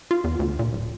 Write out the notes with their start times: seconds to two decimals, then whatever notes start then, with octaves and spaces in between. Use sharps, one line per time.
0.11 F4
0.24 E2
0.39 D2
0.59 A#2
0.73 D1